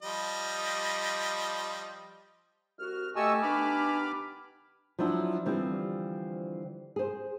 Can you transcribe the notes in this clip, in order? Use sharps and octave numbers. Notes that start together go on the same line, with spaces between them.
F3 G3 D#5
C2 F#4 F6
A3 G4 D#5 G#5 A5 C#6 E6
D#3 B3 D4 B5 D6 F6
F3 F#3 D4 E4 F#4
D3 E3 F3 G3 C4
G#4 C5